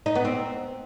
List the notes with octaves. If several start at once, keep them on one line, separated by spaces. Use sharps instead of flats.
D#4
B3
C4